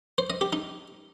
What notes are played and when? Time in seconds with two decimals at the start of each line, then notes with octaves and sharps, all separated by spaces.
0.18 C5
0.30 D#5
0.41 G4
0.53 D#4